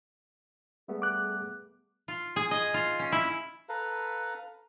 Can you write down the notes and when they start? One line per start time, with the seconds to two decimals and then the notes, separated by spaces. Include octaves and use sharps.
0.88 G3 A3 B3 G#4
1.02 D6 F#6
2.08 F4
2.36 G#4
2.51 D#5
2.74 F4
2.99 C#4
3.12 E4
3.69 A4 B4 F5 A#5